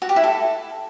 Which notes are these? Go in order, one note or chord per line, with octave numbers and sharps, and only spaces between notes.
F#4
G4
E4
A4